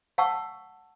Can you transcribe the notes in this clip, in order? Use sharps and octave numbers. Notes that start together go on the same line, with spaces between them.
F5 F#5 A5 C#6 E6